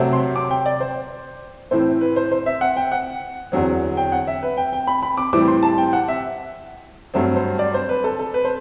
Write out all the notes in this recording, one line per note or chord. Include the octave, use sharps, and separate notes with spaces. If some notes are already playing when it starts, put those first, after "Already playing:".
Already playing: C3 F#3 A3 C4
C6
D6
G5
D5
C5
A2 E3 A3 C4 C5
B4
C5
C5
E5
F#5
G5
F#5
E2 D3 F#3 C4
G5
F#5
E5
B4
G5
G5
B5
B5
D6
A2 E3 G3 C4 D6
C6
A5
G5
F#5
E5
G2 F#3 A3 C4
C5
D5
C5
B4
A4
A4
B4
C5